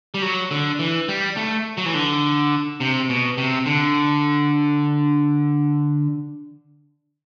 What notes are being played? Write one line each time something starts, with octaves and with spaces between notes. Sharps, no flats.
G3
F#3
D3
E3
G3
A3
F#3
E3
D3
C3
B2
C3
D3